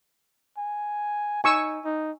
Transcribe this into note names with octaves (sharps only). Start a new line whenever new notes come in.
G#5
D#4 G#5 C#6 E6
D#4